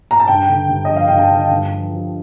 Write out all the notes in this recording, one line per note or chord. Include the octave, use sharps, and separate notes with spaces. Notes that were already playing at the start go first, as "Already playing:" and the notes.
A#5
A5
G2 G5
D3
G2
F3 D#5
F5
G2 G5
A5
D3
G2
F3
F3